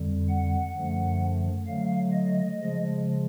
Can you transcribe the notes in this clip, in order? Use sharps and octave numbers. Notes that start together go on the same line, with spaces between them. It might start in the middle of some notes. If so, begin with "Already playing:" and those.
Already playing: F2 D3 G3
F#5
F#2 D3 F3 A3
D3 F#3 A3 F5
D#5
C#3 F3 G#3